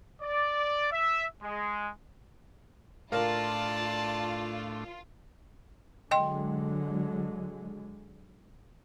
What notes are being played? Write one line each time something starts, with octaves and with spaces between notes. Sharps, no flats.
D5
E5
G#3
A2 A3 D4 F4 A#4 D5 F5 A5
D3 F#3 G#3 D#5 G5 C6